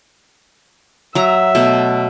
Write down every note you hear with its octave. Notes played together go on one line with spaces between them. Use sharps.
F#3 E5 A#5
B2 A3